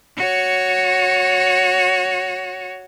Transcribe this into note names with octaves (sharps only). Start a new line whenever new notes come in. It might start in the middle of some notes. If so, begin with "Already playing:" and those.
F#4 C#5